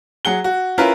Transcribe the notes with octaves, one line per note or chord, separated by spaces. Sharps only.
F#3 G#4 F#5 G7
F#4
C#4 E4 F4 A#4 B4